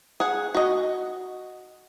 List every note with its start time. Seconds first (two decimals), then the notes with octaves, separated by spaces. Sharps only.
0.20 G#4 F#5
0.55 F#4 D#5